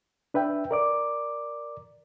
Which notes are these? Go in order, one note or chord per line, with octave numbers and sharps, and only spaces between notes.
D4 B4 E5 G5
A#4 D5 D6